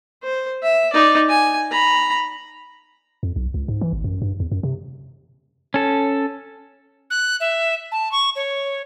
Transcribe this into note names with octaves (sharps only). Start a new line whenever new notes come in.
C5
E5
D#4 D5
G#5
A#5 B5
F2
B1
C#2
G#2
E3
G#1
F#2
G2
E2
F#2
C3
C#4 A4
F#6
E5
A5
C#6
C#5